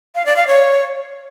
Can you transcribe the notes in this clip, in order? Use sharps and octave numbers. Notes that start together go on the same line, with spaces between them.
F5
D5
F5
C#5